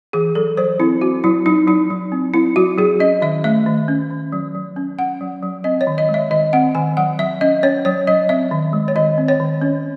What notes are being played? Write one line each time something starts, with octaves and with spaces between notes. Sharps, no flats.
E3 G#4
F#3 A4
F#3 C5
C4 E4
C4 F#4
F#3 E4
F#3 D#4
F#3 D#4
F#3
C4
C4 E4
F#3 F#4
F#3 G#4
C#4 D#5
D#3 E5
A3 E5
D#3
C#4
D#3
F#3
F#3
C#4
C#4 F#5
F#3
F#3
C4 D#5
C#5
D#3
D#5
G#3
E5
D#3 D#5
C4 F#5
D#3 G#5
F#3 F#5
F#3 E5
C#4 D#5
C#4 C#5
F#3 C#5
F#3 D#5
C4 E5
D#3
G#3
C#5
D#3 D#5
C4
C#5
D#3
C#4